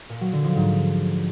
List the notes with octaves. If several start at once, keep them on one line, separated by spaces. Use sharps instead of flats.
A#2
F#3
D3
F3
G#2